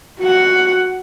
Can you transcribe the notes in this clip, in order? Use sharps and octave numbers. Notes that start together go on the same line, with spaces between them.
F#4 F#5